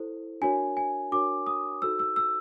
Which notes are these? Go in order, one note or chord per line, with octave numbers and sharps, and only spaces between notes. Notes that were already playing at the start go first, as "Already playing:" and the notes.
Already playing: E4 A4 C5
D4 F#4 A#4 C#5 G#5
G#5
D4 F#4 A#4 C#5 D6
D#6
D#4 F#4 A4 C5 E6
E6
E6